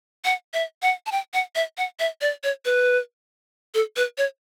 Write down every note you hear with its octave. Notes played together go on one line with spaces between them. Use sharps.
F#5
E5
F#5
A5
G5
F#5
E5
F#5
E5
D5
C#5
B4
A4
B4
C#5